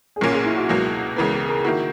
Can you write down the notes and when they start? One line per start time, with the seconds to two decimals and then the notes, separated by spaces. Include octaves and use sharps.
0.16 G#4
0.21 B1 A#2 A#3 C#4 A#4
0.33 G#4
0.45 E4
0.56 F#4
0.69 C#2 B2 F#3 A#3 F#4
1.16 C#2 C#3 E3 B3 A#4
1.32 G#4
1.48 A#4
1.64 D#3 A#3 E4 F#4